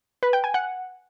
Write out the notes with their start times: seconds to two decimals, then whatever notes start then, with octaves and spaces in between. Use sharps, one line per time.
0.23 B4
0.33 G5
0.44 G#5
0.54 F#5